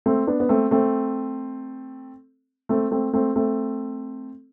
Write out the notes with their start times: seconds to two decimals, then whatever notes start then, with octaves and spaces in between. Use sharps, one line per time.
0.06 A3 C4
0.27 B3 D4
0.40 B3
0.49 A3 C4
0.71 A3 C4
2.69 A3 C4
2.91 A3 C4
3.13 A3 C4
3.36 A3 C4